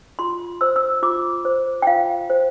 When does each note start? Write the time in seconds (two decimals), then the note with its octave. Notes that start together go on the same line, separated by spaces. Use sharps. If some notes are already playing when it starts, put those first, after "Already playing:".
0.19 F4 C6
0.61 C5 E6
0.76 E6
1.03 F4 D6
1.45 C5
1.82 G5
1.87 F4 F5
2.30 C5